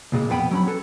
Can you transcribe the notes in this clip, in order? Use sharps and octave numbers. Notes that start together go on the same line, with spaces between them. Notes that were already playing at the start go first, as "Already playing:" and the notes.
C#2 A#2 G#3
F2 B2 B3 G5 B5
F#3 C#4 B5
A4 B4